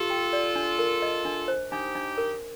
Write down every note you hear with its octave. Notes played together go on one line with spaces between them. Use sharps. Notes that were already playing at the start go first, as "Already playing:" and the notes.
Already playing: F4 G4 A4
G5
D5
D4
A#4
D#5
D4
C5
D4 D#4 G4
D4
A#4